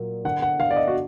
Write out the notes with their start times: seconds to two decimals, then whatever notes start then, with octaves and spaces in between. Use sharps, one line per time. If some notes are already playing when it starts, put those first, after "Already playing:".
Already playing: A#2 F#3 A#3
0.25 D3 F#5
0.42 F#5
0.59 D3 F5
0.71 D5
0.76 D#5
0.88 F#4